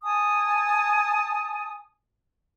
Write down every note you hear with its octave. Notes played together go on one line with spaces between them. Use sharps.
G#5 A5 D#6